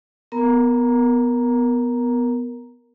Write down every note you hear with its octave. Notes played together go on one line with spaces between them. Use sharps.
B3 A#4 A#5